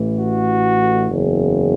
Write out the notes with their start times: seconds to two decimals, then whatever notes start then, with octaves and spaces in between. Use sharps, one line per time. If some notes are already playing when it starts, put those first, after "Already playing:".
Already playing: A1 A2 E3
0.16 F#4
1.10 F#1 E2 C#3